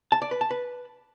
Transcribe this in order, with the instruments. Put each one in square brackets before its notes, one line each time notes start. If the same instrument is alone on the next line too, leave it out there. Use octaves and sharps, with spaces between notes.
[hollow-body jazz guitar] A5
D5
B4
A5
B4